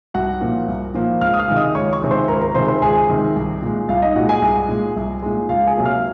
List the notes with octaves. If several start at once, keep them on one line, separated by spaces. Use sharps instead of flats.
C2 F#4 F#5
A#2 F3 A#3
C2
A#2 F3 A#3
C#2 F5 F6
D#6
F5 F6
C3 D#3 G#3
D#5 D#6
C#2 C#5 C#6
C#5 C#6
C3 D#3 G#3
C5 C6
C#2 A#4 A#5
A#4 A#5
C3 D#3 G#3 C5 C6
C5 C6
C#2 G#4 G#5
C3 D#3 G#3
C2
A#2 G#3
C2 F4 F5
D#4 D#5
A#2 G#3 F#4 F#5
G#4 G#5
C2
A#2 G#3
C2
A#2 G#3
C#2 F4 F5
G#4 G#5
C3 F#3 A#3
F5 F6